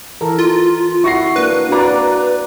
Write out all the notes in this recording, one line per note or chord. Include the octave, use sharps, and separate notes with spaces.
E3 A4 A#4
F4
E4 F#4 C#6 A#6 C7
A#3 D4 B4
A#3 D4 F#4 D5 A#5